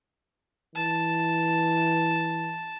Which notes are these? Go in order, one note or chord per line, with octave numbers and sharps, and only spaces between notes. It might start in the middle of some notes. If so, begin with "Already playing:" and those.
E3 A5